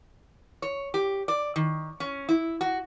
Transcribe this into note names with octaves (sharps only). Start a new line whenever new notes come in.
C#5
G4
D5
D#3
C#4
E4
F#4